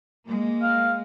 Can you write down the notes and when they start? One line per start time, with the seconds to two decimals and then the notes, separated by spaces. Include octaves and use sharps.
0.25 G#3 A#3
0.62 F5